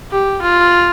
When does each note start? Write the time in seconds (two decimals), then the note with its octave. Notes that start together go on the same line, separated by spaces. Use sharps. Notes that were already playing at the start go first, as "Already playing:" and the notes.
0.11 G4
0.42 F4